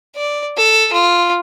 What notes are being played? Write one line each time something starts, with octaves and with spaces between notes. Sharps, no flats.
D5
A4
F4